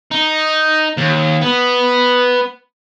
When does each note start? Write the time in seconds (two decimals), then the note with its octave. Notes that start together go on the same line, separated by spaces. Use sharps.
0.12 D#4
0.98 D#2
1.42 B3